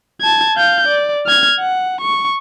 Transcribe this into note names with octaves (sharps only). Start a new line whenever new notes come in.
A5 G#6
F5 G6
D5
F6 G#6
F#5
C#6